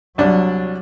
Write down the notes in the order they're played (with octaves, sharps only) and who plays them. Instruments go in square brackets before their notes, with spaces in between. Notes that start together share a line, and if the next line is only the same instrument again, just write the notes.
[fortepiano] C2 D4 [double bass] F#3